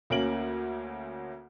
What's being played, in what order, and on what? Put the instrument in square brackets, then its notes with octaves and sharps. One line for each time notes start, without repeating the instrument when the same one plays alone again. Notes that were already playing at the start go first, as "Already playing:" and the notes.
[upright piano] D2 A#3 C#4 D7 F#7